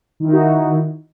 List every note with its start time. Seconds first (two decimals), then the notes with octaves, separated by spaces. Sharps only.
0.20 D#3
0.24 E4
0.28 D#4
0.33 F#4